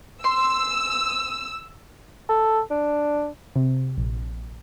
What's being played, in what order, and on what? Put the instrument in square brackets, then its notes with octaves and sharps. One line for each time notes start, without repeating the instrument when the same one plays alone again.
[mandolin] C6 [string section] E6
[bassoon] A4
D4
[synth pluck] C3
A#1